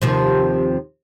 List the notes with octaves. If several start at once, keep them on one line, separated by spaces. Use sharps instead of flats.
D#2 C3 F3